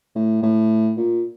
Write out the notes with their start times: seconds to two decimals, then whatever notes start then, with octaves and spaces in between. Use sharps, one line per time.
0.16 A2
0.42 A2
0.97 A#2